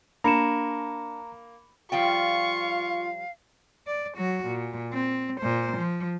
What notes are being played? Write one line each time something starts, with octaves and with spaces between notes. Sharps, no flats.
A#3 D4 A#5 B5 C#7 E7
F3 G3 F4 F5 G5 C#6
D5
F#3 F#4
A#2
C4
A#2 C5
F3